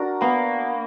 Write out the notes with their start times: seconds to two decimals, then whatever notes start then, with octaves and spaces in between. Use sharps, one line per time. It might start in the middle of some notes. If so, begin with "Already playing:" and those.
Already playing: D4 F#4 A#4
0.21 A#3 B3